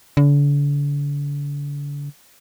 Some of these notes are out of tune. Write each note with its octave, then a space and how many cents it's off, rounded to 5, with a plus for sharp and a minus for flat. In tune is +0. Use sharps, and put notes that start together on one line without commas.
D3 -40